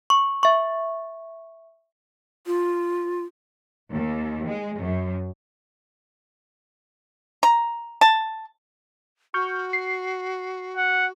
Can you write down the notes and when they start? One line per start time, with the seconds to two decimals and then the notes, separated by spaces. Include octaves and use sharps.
0.10 C#6
0.43 E5 C#6
2.47 F4
3.92 D#2
4.48 G#3
4.78 F#2
7.43 A#5
8.01 A5
9.34 F#4 C#6 F6 G6
9.73 C7
10.77 F#5